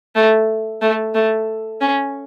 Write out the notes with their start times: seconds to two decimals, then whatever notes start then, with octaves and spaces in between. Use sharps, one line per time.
0.16 A3
0.82 A3
1.15 A3
1.81 C#4